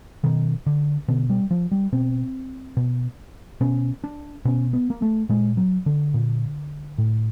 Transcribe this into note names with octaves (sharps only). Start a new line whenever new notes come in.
B2 D#3
D3
B2 D3
G3
F3
G3
B2 C4
B2
B2 C#4
D4
B2 C#4
B3
A#3
A3
A#2 G#3
F#3
D3
A#2
A2